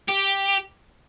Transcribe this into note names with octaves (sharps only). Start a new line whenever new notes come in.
G4